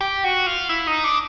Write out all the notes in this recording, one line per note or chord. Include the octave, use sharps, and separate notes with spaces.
G4
F#4
F4
E4
D#4
D4